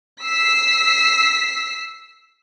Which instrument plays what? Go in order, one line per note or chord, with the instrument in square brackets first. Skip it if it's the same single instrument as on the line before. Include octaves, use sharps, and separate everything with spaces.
[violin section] E6 B6 C7